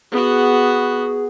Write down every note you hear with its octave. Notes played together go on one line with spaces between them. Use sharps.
B3 F#4 G#4